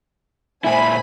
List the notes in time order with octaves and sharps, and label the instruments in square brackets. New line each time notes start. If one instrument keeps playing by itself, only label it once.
[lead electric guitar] A#2 E4 [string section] C5 G#5 B5